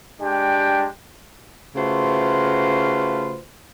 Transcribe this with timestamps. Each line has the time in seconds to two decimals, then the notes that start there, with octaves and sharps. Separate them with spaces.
0.21 G#3 D4 G4 G5
1.76 C#3 A3 F4 F#4 B4 C5